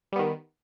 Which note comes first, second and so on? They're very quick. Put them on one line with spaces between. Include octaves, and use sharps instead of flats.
G3 B3 D#3